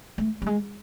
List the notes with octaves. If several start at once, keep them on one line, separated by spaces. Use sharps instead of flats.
A3
G3
G#3